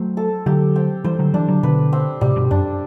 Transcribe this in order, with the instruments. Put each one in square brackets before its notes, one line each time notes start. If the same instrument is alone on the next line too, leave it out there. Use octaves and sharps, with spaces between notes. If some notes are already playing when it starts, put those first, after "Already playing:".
Already playing: [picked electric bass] F#3 A3 [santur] C4
[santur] A4
[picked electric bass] D3 F#3 [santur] G4
[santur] C4
[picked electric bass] E3 G3 [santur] C5
[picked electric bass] D3 F#3
[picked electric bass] E3 G3 [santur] D4
[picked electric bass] D3 F#3
[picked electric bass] B2 D3 [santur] B4
[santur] C4
[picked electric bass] A2 C3 [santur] G3
[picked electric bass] G2 B2
[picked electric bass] F#2 [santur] D4